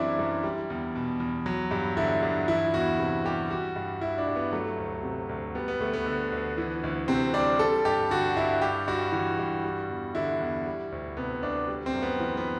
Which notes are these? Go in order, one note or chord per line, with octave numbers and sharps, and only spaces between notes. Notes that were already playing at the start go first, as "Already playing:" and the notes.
Already playing: F#2 E3 G3 C4 D4 E4
F#2
G3
E2
B2
E2
F#3
G2
D3 E4
G2
E3 E4
E2 F#4
C3
G3 G4
G3 F#4
G2
E3 E4
D4
G2
B3
F#3 A3
D2
C3
D2
G3 B3
B3
D2 A3
B3
D3
D2
E3
D2
C3 C4
G3 D4
G3 A4
G2 G4
D3 F#4
G2 E4
G3 G4
G2 F#4
E3 F#4
G2
G3
E2
D3 E4
E2
G3
D2
C3 B3
D2 D4
G3
C4
F#2
B3
E3
B3